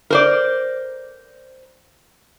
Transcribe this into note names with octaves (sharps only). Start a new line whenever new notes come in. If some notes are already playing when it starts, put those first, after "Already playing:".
A#4 C5 D5